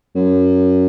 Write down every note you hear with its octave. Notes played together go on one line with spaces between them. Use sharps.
F#2